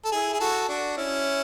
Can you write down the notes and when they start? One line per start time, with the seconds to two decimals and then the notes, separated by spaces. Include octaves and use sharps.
0.05 A4
0.12 E4 G#4
0.33 G#4
0.40 F#4 A4
0.68 D4 F#4
0.97 C#4 E4